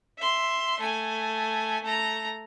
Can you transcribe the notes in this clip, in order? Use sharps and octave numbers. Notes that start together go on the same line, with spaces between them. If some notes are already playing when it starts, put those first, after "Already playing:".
E5 C6
A3 G#5
A3 A#5